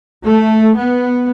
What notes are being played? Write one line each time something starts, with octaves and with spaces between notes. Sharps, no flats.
A3
B3